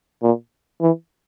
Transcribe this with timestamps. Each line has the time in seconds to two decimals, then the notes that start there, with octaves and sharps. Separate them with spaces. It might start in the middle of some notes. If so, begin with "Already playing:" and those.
0.23 A#2
0.81 E3